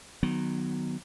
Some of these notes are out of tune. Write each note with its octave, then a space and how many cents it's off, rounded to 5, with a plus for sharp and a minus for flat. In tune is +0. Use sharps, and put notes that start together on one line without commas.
D#3 -20 F#3 +0 B3 +0